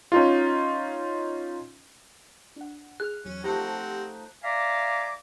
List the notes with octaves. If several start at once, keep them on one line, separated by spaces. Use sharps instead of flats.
C#4 D#4 F4
D4 F#5
G#4 F6 F#6
E2 F#3 C#4
F3 A3 C4 D#4 G4 F#5 A#6
D5 E5 F5 G#5 A#5 D6